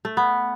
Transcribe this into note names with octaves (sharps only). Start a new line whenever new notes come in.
A3
B3